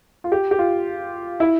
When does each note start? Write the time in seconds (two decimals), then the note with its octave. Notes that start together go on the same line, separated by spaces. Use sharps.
0.24 F4
0.32 G4
0.51 G4
0.59 F4
1.40 E4